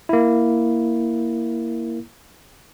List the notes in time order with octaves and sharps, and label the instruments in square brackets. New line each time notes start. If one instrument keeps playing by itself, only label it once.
[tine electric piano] A#3 E4